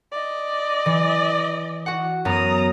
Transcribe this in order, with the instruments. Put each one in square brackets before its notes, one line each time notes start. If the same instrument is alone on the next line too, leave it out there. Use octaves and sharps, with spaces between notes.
[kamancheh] D5 D#5
[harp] E3
F#4 F#5
[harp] F#2 B3 [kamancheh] A#5 D#6